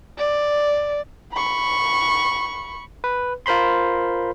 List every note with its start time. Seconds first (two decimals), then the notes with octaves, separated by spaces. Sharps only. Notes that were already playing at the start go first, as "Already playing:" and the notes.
0.18 D5
1.33 B5 C#6
3.04 B4
3.46 F4 A#4 C5 B5 C6